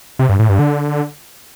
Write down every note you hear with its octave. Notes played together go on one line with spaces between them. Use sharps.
C3
G2
A2
G2
D3